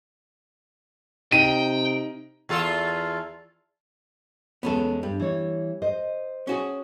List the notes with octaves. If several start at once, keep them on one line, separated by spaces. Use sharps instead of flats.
C3 D#4 G5 D#7
E2 F4 A4
E2 G#3 B3 C#4 A4
G2 G3
E3 C#5
C5 D#5
C#4 F#4 G#4